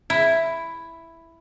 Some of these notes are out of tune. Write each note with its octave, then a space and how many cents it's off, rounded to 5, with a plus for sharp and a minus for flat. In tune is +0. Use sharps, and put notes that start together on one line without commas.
E4 +5